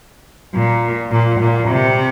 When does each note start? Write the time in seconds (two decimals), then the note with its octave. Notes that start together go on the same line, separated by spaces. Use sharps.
0.54 A#2
1.11 A#2
1.40 A#2
1.69 C3